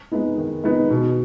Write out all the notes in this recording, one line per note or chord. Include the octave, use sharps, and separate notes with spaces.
G#3 B3 D#4
D#3
G#3 B3 D#4
B2